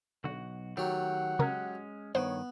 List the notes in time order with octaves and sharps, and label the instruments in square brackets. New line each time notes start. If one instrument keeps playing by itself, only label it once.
[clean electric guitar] B1 F#4 [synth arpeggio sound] D3
[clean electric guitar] D#3 A3 [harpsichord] F#3 G4 [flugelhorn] F#5
[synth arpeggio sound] C#3 A#4 [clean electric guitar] G#3 C#4
[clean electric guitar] G2 D#3 [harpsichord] B3 [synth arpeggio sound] C5 [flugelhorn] C#5